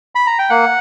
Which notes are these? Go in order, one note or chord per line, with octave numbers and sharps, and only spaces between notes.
B5
A#5
G5
A#3 F#5